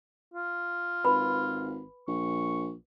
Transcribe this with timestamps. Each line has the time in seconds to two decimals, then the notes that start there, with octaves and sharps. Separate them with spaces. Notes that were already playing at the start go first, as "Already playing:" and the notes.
0.34 F4
1.05 G#1 B4 B5
2.08 A#1 C#6